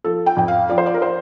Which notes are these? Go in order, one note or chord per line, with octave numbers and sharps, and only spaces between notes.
F3 A4
G5
F2 G5
F5
F3 D5
C5
D5
A#4
C5